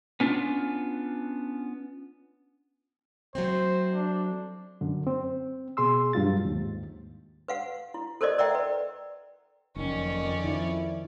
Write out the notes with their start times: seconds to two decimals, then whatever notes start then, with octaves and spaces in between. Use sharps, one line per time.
0.20 B3 C#4 D4 F4
3.35 F#3 A3 C4 C5
3.94 D4
4.81 F#2 D3
5.07 C4
5.77 B2 G#4 C6 E6
6.13 G2 F#3 F4 A6
6.45 D#2 G#2
7.48 B4 F5 F#5
7.94 E4
8.21 A4 A#4 C5 D5 D#5
8.38 A#4 D5 E5 F#5 G5 A#5
8.55 B4
9.76 F#1 F2 D#3 C#4 D5
10.44 D#3 F3 E4